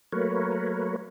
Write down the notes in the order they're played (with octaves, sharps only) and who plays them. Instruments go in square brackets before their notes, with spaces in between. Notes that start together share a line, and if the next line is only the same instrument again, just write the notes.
[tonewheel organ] F#3 A3 A#3 A#4 B4 C#5